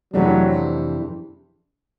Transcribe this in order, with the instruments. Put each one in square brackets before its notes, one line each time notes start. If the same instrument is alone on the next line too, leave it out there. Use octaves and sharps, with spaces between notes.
[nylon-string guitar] F2 C3 E3 A3 D4 [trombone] F#3